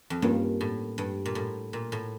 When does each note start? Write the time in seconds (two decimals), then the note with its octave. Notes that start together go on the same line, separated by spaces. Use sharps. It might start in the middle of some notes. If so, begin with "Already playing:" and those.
0.10 F2
0.22 G2 A#3 C#4 F4 A#4
0.61 A2
0.98 G2
1.25 A#2
1.35 A2
1.73 A#2
1.92 A2